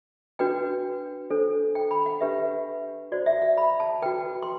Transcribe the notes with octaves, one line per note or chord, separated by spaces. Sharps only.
D4 F#4 B4 G5
D4 A4 C5
G5
B5
F#5
D4 G4 B4 E5
F#4 C5 D5
E5
F#5
B5
A5
F#4 B4 G5
C6